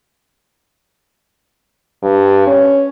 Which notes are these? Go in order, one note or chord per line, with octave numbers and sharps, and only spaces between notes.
G2
C#4